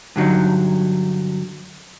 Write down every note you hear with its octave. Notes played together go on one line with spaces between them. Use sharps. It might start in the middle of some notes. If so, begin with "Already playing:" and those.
G2 D3 F#3 D#4